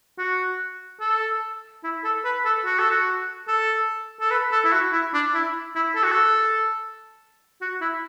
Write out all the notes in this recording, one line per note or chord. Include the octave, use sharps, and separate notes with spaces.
F#4
A4
E4
A4
B4
A4
F#4
A4
F#4
A4
A4
B4
A4
E4
F#4
E4
D4
E4
E4
A4
F#4
A4
F#4
E4